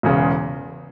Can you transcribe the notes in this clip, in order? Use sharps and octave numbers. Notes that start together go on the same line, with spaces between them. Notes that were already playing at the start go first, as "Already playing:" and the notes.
E1 E2 C#3